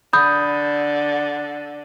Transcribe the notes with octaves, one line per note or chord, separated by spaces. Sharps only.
D3 B5 D#6 G6